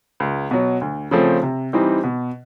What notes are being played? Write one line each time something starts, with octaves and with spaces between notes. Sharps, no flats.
C#2
B2 F#3
D2
C#3 F3 A3 C4
C3
E3 G3 C4 D#4
B2